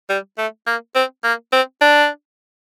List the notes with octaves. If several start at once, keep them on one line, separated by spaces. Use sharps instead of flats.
G3
A3
A#3
C4
A#3
C4
D4